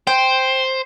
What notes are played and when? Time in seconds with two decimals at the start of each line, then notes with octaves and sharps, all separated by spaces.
0.07 C5 G5